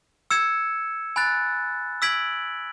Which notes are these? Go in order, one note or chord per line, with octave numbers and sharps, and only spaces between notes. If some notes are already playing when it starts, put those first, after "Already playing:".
E6 G#6 C#7 E7
G#5 B5 F#6 A6
E6 G#6 B6 D7 F#7